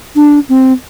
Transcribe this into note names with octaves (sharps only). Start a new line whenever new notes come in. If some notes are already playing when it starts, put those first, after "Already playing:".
D4
C4